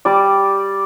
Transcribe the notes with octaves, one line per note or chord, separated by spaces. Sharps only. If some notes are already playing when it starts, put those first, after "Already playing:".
G3 D5 D6